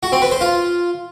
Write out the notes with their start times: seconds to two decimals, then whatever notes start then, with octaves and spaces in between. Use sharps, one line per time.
0.03 F#4
0.12 C4
0.22 B4
0.31 C5
0.41 F4